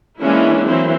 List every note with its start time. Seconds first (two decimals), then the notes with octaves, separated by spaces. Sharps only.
0.21 E3 G#3 A#3 C#4 D4 E4
0.67 E3 F#3 A#3 C4 E4